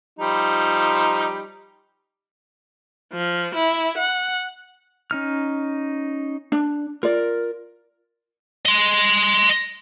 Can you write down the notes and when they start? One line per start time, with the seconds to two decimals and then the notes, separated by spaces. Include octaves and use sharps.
0.19 F3 G3 D#4
3.13 F3
3.55 E4
3.98 F#5
5.11 C#4 D#4 F6
6.52 D4
7.03 F4 A#4 D5
8.66 D#5 C6